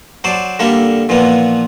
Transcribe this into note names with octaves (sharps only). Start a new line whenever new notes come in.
F#3 C5 D5 A5
D3 G3 A#3 A4 E5
A#2 E3 F3 B3